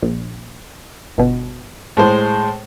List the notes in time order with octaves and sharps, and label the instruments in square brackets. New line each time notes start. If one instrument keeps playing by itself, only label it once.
[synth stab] A#1
G1 B2
[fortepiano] A2 G#3 C5